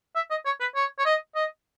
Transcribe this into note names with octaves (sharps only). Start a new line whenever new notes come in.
E5
D#5
C#5
B4
C#5
C#5
D#5
D#5